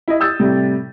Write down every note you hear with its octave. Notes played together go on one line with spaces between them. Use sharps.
E4 D#5
D#6 E6 G6 A6
A2 C3 G3